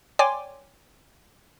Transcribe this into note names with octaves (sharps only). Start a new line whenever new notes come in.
C#5 D5 G5 G#5 C6 D6